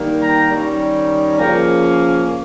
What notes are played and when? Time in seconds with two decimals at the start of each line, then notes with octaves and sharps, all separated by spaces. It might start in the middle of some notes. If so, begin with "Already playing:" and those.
Already playing: D#3 G3 A#3
0.21 G5 A#5
0.50 D#3 G3 C#4
1.37 C#3 F3 A#3 C#4 G5 A#5